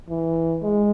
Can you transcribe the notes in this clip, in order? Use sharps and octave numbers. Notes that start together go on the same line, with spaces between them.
E3
G#3